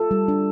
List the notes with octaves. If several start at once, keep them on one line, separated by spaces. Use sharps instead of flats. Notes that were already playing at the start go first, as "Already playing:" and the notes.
Already playing: F4 A4
G3
D4